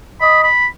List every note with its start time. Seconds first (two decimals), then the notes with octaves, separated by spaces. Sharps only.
0.21 D#5 B5
0.43 B5